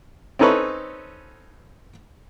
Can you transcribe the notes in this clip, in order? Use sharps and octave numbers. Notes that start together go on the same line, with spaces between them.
C4 C#4 D#4 A4 B4 C#5